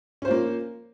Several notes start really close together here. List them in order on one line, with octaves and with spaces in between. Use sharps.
C#4 C5 F4 A#3